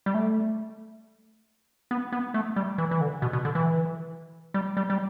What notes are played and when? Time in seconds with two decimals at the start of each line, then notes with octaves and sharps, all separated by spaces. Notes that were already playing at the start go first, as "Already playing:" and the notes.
0.06 G3
0.14 A3
1.91 B3
2.12 B3
2.34 A3
2.56 G3
2.78 E3
2.91 E3
3.01 D3
3.22 B2
3.33 B2
3.45 D3
3.55 E3
4.54 G3
4.77 G3
4.90 G3